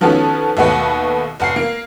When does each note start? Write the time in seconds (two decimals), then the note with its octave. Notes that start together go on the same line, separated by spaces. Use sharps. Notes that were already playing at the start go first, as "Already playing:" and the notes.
0.01 D#3 F3 B3 C#4 F#4 A4
0.57 D#2 B2 A3 F#4 B4 F#5
1.40 F1 F#5 C7
1.56 A#3